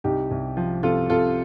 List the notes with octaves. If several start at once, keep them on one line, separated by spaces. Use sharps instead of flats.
C2 D#4 G4
C2
F3
C3 F4 A4
C3 F4 A4